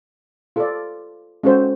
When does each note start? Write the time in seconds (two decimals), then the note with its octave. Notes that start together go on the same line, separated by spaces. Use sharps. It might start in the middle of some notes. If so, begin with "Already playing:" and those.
0.56 F4 A4 D5
1.43 G#3 C#4 F#4 A4 C5